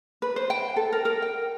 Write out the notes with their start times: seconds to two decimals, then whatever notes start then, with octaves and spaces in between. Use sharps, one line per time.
0.22 B4
0.36 C5
0.50 G5
0.76 A4
0.92 A#4
1.05 A#4
1.22 G5